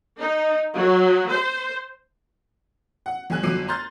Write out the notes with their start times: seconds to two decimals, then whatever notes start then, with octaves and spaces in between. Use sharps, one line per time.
0.20 D#4
0.75 F#3
1.32 C5
3.06 F#5
3.30 G1 G3 G#5 F#6
3.43 G1 F2 F#3 D6 C7 D#7
3.68 A#5 C6 F6 G6 A6